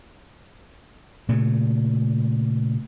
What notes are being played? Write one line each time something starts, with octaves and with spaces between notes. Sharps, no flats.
A#2 C#3 A3